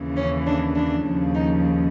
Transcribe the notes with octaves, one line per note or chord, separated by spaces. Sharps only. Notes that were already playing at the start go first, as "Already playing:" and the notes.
Already playing: D#2 C#3 E3
C#4
D4
D4
D#2 C#3 F3
D#4